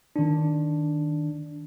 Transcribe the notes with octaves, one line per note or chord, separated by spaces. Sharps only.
D#3 D4